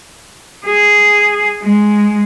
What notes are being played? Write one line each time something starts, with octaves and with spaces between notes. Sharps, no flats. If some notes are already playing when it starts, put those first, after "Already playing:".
G#4
G#3